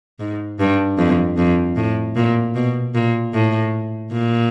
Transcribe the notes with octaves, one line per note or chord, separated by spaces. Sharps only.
G#2
G2
F2
F2
A2
A#2
B2
A#2
A2
A#2